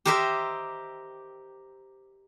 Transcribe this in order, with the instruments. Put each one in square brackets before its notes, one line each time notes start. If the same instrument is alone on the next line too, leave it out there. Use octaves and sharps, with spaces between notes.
[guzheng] G4 A#4 C5 D#5 E5